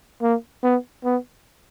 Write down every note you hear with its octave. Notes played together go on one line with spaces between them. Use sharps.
A#3
B3
B3